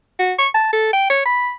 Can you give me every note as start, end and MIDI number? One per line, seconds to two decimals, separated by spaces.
0.19 0.33 66
0.39 0.48 85
0.54 0.72 81
0.73 0.89 69
0.93 1.08 79
1.10 1.21 73
1.25 1.53 83